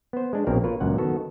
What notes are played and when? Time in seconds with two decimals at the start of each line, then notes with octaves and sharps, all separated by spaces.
0.13 B3 C5
0.33 G#3 D4
0.47 A#1 B2 A#3 C4 C#4 A#4
0.63 A#3 F4 A#4 B4 C#5
0.80 C#2 F#2 A#2 F#5
0.98 D#3 B3 F#4 A4